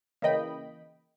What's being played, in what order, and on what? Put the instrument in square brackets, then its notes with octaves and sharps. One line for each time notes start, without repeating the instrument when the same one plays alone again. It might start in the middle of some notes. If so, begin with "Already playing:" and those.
[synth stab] C#3 E3 A#3 D#5 G5 B5